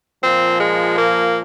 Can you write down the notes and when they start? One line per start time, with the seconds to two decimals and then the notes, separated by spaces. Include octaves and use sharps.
0.21 A#2 F3 C4
0.60 G#3
0.98 A#3